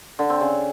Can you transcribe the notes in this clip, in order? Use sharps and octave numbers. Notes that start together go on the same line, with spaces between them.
D3
C4
C#3